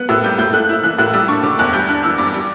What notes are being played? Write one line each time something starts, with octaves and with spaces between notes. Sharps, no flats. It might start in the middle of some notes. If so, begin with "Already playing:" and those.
Already playing: B3 F#6
A2 E6
G3 G6
A2 G6
A3 F#6
F#6
E4 E6
E3 F#6
A2 F#6
G3 E6
D4 C#6
D3 D6
E2 F#6
G3 G6
D4 F#6
E3 E6
G2 D6
G3